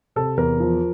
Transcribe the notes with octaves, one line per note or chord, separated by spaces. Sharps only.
C3 A4
E2 A#4
F3